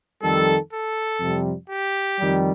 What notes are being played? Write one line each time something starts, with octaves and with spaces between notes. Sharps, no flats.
F2 D#3 G3 A4
A4
F2 C3 G3
G4
F2 D#3 G3